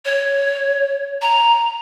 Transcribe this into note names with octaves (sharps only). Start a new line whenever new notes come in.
C#5
A#5